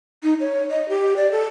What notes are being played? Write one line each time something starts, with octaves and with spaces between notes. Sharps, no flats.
D#4
C#5
D#5
G4
D5
A4